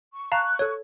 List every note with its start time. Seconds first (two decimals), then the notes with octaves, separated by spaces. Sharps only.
0.13 C#6
0.32 F5 A5 A#5 C#6 F#6
0.59 A4 C#5